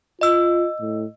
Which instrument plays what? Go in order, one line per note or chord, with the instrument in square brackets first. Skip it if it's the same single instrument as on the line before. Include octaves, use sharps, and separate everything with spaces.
[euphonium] F4 [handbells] D#5 E6
[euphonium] A2